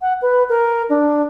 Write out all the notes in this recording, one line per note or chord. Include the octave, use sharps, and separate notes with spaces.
F#5
B4
A#4
D4